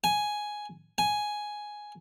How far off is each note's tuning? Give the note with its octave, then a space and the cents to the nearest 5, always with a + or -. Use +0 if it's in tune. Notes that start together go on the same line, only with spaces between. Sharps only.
G#5 +5
G#5 +5